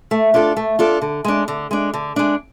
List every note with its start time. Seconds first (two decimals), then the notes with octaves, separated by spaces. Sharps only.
0.11 A3
0.34 D4 F4 A4
0.57 A3
0.79 D4 F4 A4
1.02 D3
1.25 G#3 D4
1.48 D3
1.71 G#3 D4
1.94 D3
2.16 G#3 D4